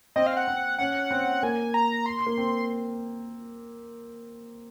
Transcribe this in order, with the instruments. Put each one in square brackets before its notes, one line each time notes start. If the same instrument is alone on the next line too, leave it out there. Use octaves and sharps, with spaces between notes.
[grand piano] C4 [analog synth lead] D#5
[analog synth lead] F5
F#5
[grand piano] C4
[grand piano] C#4 [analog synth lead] F#5
[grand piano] C4
[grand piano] A#3 [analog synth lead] G#5
[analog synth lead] A#5
C6
[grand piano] A#3
C4